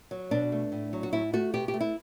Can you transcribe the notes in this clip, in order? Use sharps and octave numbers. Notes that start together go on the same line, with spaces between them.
F#3
B2 D4
A3
A2
F#3
F#4
A2 E4
A3 F#4
B2 G4
G4
A3
E4